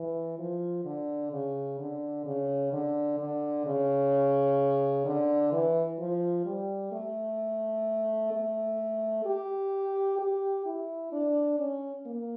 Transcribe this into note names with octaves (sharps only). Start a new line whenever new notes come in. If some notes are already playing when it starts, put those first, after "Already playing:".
Already playing: E3
F3
D3
C#3
D3
C#3
D3
D3
C#3
D3
E3
F3
G3
A3
A3
G4
G4
E4
D4
C#4
A#3